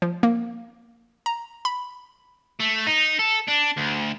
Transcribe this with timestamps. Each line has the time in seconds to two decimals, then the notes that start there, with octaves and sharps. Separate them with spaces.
0.02 F3
0.23 A#3
1.26 A#5
1.65 B5
2.60 A3
2.86 D#4
3.19 A4
3.48 D4
3.77 D2